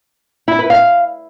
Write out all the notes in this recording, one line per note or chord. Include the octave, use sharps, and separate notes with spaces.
E4
B4
F5